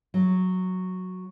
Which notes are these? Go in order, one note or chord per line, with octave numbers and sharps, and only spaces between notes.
F#3